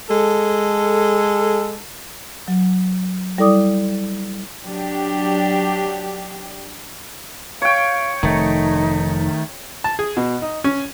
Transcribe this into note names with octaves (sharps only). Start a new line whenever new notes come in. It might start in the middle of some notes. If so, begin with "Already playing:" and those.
G#3 A4
F#3
G3 E4 A4 D5 D6 D#6
F#3 D4 G4
C#5 F5 G5
F1 D#3 A3 D#4
A5
G#4
B2
D#4
C#4